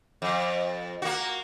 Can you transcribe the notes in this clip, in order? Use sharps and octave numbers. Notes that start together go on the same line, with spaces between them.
F2
A#3 F#4